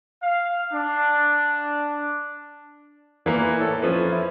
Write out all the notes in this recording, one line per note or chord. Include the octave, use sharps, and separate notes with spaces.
F5
D4
A#2 E3 A#3 B3
A2 A4
F2 F3 C#4 B4
E4